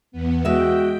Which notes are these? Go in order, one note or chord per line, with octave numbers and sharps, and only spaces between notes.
E2 B3
G#3 F#4 E5 G5